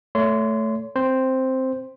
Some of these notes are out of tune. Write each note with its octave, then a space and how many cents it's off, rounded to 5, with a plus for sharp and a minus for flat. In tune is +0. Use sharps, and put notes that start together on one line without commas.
A3 +0 C#5 +25 C6 -20
C4 +0 C5 +0